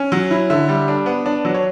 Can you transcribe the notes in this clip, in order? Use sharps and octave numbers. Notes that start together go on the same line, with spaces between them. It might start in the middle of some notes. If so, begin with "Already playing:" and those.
Already playing: C#4
F#3
E4
D3 E5
G3
D4
B3
D4
F#3
C#5